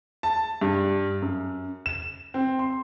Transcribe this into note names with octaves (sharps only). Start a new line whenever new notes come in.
A5
G2
F#2
E7
C4
C6